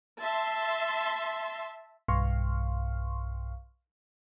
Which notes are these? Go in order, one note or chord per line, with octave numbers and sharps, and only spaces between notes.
E5 A5 C6
B1 G2 F5 C6 C#6 F6